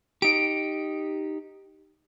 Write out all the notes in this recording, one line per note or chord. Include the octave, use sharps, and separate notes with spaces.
D#4 G4 D7